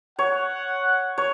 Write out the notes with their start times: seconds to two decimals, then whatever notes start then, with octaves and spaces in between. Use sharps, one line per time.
0.19 C#5 F#5
1.18 C#5